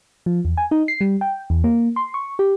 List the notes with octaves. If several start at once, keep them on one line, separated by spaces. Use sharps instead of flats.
F3
E2
G#5
D#4
C7
G3
G5
E2
A#3
C6
C#6
G4